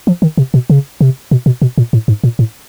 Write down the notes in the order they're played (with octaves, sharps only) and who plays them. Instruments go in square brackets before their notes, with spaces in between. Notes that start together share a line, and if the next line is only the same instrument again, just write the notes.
[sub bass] F3
D#3
C3
B2
C#3
C3
B2
B2
B2
A#2
A2
G#2
A#2
A2